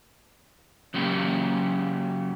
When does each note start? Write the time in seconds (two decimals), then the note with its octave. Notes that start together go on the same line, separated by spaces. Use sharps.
0.94 C#3 F#3 A#3 G4